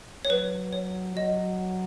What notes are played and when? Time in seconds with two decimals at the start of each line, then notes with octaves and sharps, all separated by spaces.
0.25 C#5
0.30 F#3 B4
0.73 C#5
1.16 F#3 D#5